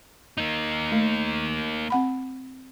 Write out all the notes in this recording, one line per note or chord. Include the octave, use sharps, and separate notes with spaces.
A#3 D#4
A3
C4 F#5 B5